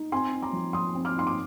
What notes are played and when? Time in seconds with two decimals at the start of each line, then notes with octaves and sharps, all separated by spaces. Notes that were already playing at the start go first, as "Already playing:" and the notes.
Already playing: D#4
0.12 C4 G#5 C6
0.33 D#4
0.42 A#5 D6
0.53 F3
0.73 F3 C6 D#6
0.95 C4
1.05 D6 F6
1.16 D#4 C6
1.27 D6